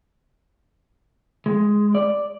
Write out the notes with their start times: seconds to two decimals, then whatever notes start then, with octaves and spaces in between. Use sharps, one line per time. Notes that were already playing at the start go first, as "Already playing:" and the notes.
1.46 G#3
1.95 D5